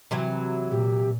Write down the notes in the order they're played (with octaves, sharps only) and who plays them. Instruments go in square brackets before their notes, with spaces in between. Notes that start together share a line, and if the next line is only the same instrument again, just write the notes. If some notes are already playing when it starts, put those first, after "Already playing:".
[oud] C3 E3 F#3
[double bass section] A#2 [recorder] G4